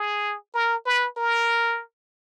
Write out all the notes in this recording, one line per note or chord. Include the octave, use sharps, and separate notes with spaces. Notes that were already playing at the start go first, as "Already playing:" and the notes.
Already playing: G#4
A#4
B4
A#4